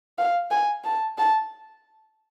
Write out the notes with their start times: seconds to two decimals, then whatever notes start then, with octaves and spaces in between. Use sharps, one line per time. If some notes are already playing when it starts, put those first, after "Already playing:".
0.18 F5
0.51 G#5
0.84 A5
1.18 A5